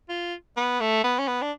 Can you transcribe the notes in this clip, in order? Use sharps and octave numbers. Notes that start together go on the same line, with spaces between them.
F4
B3
A3
B3
C#4
B3
D4